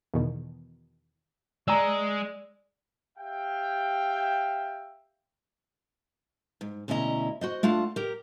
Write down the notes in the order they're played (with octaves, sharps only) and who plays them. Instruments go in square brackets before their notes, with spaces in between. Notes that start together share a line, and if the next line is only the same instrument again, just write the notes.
[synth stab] E2 B2 D#3
[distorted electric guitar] G#3 [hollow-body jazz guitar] D5 G#5 A#5 [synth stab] E6
[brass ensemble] G4 E5 F5 G5
[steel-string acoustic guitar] G#2
D2 B2 C#4 E4 D#5 A#5
F#4 C5 D#5
A3 D4 F4 F#5 A5
G4 A#4